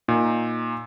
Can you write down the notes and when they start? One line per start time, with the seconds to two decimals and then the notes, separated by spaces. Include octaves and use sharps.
0.08 A#2 D#4